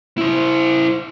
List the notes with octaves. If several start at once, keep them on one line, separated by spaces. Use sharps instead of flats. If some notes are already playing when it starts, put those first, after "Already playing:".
E4 C5